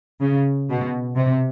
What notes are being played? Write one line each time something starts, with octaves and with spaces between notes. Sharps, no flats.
C#3
B2
C3